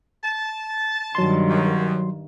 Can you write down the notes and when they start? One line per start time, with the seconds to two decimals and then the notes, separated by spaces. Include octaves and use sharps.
0.24 A5
1.15 G2 D#3 F#3 C6
1.50 F#2